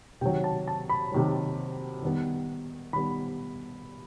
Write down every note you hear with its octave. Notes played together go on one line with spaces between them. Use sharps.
C3 D#3 F#3 G5
A5
A5
B5
C3 D#3 F#3
D#3 G3 B3
D#3 G3 B3 B5